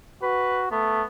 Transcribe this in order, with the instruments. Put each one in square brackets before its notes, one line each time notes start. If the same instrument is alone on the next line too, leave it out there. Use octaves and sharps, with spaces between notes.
[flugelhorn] F#4 [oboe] B4
[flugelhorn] A3 [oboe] B3